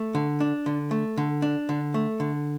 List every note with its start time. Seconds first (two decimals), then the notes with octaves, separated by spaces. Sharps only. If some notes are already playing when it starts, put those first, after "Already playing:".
Already playing: A3
0.15 D3
0.40 D4
0.66 D3
0.91 A3
1.18 D3
1.42 D4
1.69 D3
1.94 A3
2.20 D3